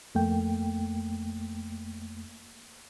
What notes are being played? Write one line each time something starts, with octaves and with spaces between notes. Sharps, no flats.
F2 A3 A#3 G5